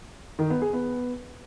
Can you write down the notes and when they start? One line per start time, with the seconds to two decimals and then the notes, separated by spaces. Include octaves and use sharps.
0.39 D#3
0.50 B3
0.62 G#4
0.73 B3